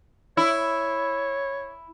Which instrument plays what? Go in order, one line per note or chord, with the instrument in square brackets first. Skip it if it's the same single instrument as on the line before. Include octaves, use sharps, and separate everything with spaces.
[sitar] E4 [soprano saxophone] C#5